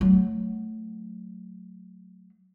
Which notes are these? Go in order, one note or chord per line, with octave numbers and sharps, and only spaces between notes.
F#3 A3